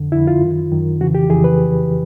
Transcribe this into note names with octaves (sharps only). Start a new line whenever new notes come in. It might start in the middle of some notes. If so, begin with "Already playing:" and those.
Already playing: F2 D3
F2 D3 E4
F4
F#2 D#3
F#2 D#3
F2 C#3 E3 F#4
G4
F2 C#3 E3 G#4
B4